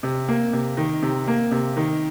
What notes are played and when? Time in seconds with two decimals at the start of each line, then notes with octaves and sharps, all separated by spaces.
0.03 C3
0.28 A#3
0.53 C3
0.77 D#3
1.02 C3
1.28 A#3
1.51 C3
1.77 D#3